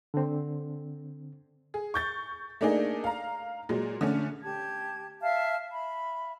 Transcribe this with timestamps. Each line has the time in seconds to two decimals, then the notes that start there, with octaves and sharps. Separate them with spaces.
0.14 D3 C4
1.74 G#4
1.94 C#6 G6 A6
2.61 A3 A#3 D4 D#4 G#4
3.04 F5 A#5
3.69 A#2 F#3 G#3
4.01 D3 A3 C#4
4.42 G4 A5 G#6
5.21 E5 F5 A5 F6
5.72 E5 B5